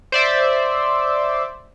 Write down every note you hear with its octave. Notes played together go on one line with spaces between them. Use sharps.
C5 D5 E5